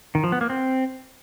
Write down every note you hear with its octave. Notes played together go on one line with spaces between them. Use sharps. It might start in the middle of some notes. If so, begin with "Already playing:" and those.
D#3
F3
B3
A#3
C4